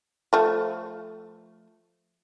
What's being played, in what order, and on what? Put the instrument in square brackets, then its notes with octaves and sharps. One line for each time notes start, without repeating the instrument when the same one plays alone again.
[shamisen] F3 A3